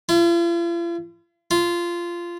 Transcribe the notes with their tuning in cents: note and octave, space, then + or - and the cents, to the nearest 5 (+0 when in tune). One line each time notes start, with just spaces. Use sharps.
F4 -45
F4 -15